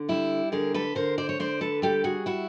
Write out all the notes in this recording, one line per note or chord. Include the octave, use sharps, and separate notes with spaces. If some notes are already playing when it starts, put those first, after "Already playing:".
Already playing: D3
G3 E4
D3 G#4 A#4
A4 B4
D3 A#4 C5
C5 D5
C#5
D3 C5 D5
A4 B4
G3 G4 A4
F#4 G#4
E4 F#4